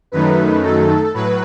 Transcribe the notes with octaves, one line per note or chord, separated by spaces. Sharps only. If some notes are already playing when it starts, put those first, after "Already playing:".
F#2 D#3 F#3 A3 D#4 B4
A4
A2 F#3 B4